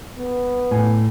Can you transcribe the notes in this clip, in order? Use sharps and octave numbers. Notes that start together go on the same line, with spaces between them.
B3
A2 G#5